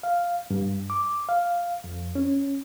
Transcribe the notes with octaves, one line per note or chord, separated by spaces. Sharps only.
F5
G2
D6
F5
F2
C#4